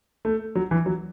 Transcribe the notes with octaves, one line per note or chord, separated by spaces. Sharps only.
A3
F#3
E3
F#3